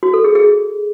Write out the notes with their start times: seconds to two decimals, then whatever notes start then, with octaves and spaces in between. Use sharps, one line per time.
0.03 F#4
0.14 A4
0.24 G#4
0.35 G#4